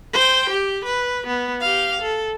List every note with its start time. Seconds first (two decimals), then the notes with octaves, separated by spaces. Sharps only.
0.13 C5 G5
0.50 G4
0.85 B4
1.27 B3
1.61 G4 F5
2.02 A4